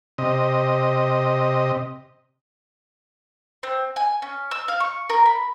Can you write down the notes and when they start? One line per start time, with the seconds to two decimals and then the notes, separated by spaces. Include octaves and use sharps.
0.18 C3 D#5
3.63 C4
3.96 G#5
4.22 C#4
4.51 E6
4.68 F5
4.80 C#6
5.10 A#4
5.26 B5